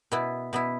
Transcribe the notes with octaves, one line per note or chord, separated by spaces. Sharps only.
B2 B3 E4
B2 B3 E4